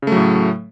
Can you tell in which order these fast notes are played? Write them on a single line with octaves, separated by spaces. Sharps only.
C#3 A3 F#3 A2